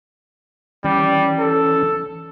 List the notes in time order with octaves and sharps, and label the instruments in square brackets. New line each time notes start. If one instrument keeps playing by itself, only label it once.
[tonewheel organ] E3 C#4 [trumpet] G3
[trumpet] A4